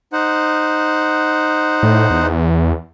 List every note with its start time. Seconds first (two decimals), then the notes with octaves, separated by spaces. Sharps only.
0.13 D#4 C5 F#5
1.83 A2
2.10 E2